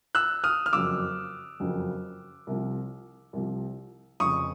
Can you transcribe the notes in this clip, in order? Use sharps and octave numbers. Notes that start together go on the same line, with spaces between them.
E6 F#6
D#6 F6
F6
F#1 F2 C#3 F#3 D6 E6
F#1 F2 C#3 F#3
C2 C3 F3
C2 C3 F3
F1 F2 C#3 C#6 D#6